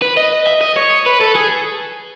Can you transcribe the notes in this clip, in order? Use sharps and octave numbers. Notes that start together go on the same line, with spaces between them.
B4
D#5
E5
D#5
C#5
B4
A4
G#4